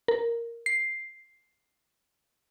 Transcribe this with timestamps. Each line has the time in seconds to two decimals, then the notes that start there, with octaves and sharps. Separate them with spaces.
0.08 A#4
0.66 C7